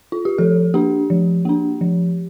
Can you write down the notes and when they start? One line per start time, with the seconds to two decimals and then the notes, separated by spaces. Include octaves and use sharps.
0.12 F4
0.25 G4
0.38 F3 A4
0.74 A#3 D4 G4
1.10 F3
1.45 A#3 D4
1.81 F3